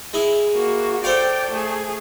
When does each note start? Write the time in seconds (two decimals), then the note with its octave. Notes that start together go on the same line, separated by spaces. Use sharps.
0.14 G#3 E4 G#4
0.55 A#3 F#4
1.04 A4 C5 D5 F5 G5
1.51 A3 G#4